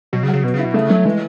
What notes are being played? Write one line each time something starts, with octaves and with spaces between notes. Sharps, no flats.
B2 F#3
C#3
F#3
C#3
B2 B3
C#3
E4
B2
C#3 A3
F#3 A3
E3 G#3